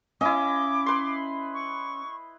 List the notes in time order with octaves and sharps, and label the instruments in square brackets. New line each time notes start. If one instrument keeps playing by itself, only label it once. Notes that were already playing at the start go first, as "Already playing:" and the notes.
[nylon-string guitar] C#4 F5 G#5 [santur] E4 D#5 [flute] D6
[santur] B4 C6
[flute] C#6